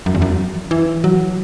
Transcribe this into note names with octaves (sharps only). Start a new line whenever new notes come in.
F#2
E2
F#2
E3
F#3